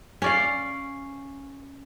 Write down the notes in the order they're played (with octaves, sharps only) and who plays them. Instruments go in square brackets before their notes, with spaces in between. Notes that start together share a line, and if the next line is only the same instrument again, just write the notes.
[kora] C#4 D5 F5